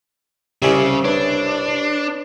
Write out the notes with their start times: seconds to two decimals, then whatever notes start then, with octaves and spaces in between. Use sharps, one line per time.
0.62 C2 C#3 G4 D5 E5 G#5
1.05 D4 B4 C#5